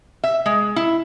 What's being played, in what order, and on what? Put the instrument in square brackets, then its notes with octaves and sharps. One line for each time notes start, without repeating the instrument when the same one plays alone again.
[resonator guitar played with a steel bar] E5
G#3
E4